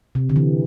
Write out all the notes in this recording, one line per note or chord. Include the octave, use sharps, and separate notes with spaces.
C3
D3
E3